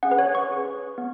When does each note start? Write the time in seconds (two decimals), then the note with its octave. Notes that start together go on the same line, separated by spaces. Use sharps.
0.03 C#4 G#4 F#5
0.11 B4
0.19 C#5
0.35 C#6
0.51 C#4 G#4
0.98 B3